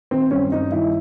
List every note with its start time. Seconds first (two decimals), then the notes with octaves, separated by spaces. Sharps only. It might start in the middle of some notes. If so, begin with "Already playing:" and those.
0.11 D#3 C4
0.31 G2 C#4
0.52 G2 D#4
0.71 D#3 E4